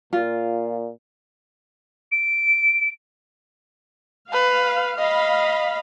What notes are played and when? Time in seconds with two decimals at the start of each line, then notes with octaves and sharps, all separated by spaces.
0.13 A#2 F4
2.11 D7
4.33 B4 F5
4.99 D#5 F5 B5